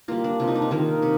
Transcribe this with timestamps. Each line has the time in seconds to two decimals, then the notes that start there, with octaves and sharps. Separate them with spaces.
0.08 G3 A#3 F4
0.24 D4
0.40 C3 F4
0.47 D#4
0.55 D4
0.62 D#4
0.71 D#3 A#3 F4
1.02 C3